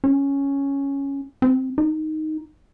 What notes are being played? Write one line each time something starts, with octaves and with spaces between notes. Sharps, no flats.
C#4
C4
D#4